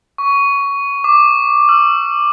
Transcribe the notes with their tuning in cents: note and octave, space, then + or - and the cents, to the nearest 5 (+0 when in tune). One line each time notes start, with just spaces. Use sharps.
C#6 +15
D6 +10
E6 +45